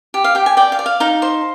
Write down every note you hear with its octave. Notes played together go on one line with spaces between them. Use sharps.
G4
F5
G4 G5
G#5
D5 G5
F5
D5
F5
D#4 F5
C5